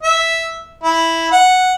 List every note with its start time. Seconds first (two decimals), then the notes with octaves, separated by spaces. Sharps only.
0.03 E5
0.83 E4
1.32 F#5